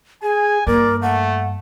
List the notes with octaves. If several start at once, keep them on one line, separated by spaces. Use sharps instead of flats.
G#4 G#5
G2 A#3 A#4 D5
A3 F#5